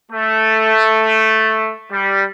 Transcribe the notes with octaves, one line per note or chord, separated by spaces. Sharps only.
A3
G3